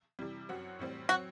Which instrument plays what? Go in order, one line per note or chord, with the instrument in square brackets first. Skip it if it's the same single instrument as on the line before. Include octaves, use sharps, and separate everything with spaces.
[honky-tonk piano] C3 E3 G3
F#2 F#3 C4 F#4
A2 E3 G3 C4
[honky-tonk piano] F#3 C4 [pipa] F#4